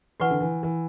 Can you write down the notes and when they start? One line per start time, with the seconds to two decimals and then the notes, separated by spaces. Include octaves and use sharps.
0.20 E3 F#4 B4 F#5 C#6
0.30 D3
0.40 E3
0.63 E3